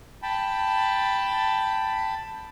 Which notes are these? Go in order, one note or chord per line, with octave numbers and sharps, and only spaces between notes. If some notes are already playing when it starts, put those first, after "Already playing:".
G5 A5 B5